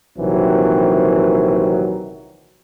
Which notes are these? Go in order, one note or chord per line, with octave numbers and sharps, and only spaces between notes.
A#1 C3 D#3 E3 F#3 C4